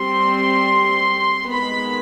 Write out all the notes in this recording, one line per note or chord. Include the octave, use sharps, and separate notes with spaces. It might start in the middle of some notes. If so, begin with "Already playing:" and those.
Already playing: G3 C4 C6
D#3 G#3 B3 B5